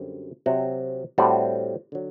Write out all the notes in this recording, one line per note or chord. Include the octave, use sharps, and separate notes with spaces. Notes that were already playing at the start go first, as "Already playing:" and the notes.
Already playing: F#2 D3 G3 C4
C3 F#3 C4 F#4
A2 G3 C4 F#4
D3 F#3